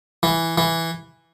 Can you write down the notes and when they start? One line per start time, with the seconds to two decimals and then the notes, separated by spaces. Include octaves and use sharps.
0.23 E3
0.58 E3